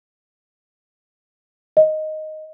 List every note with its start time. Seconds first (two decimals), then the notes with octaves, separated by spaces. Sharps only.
1.77 D#5